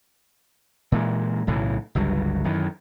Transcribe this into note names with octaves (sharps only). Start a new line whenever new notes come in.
A#2 E3 G#3
B1 A2 C#3 E3
G1 C#2 G2 F#3
F#2 D#3 E3